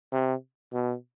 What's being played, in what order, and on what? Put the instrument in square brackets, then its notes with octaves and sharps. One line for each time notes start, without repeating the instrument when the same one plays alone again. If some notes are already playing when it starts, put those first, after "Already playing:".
[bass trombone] C3
B2